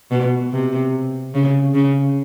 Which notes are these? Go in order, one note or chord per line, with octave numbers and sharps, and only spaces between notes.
B2
C3
C#3
C#3